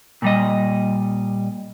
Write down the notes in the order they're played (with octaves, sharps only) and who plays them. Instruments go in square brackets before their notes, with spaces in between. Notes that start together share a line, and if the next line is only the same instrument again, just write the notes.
[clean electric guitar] A#2 G3 D#5